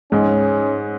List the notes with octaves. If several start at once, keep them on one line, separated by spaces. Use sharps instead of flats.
G#2 G#3 C#4